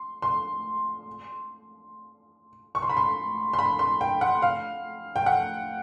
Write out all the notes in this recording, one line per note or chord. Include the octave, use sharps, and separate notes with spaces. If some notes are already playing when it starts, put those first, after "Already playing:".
Already playing: C6
C6
C#6
C6
B5
C6
C6
B5
C6
G5
F#5
F5
G5
F#5